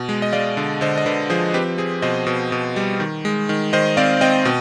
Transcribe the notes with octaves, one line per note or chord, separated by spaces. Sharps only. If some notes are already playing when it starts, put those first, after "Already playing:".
Already playing: B2
G#3
D#5
G#3 D5 F5
D3
D3 C5 D#5
D#5
D3 B4 D5
F3 G#4 C5
C4 G4 B4
C4 G#4
B2 C5 D#5
B2
B2
G3
D#3
G#3
D#3
D#3 C5 D#5
C4 D5 F5
C4 D#5 G5
B2